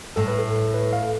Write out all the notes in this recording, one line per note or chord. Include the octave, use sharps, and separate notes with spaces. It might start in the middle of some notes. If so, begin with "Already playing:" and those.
A2 A4
B4
A4
B4
F5